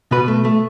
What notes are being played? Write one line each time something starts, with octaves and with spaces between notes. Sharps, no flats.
B2 F#4 B4
A3
A3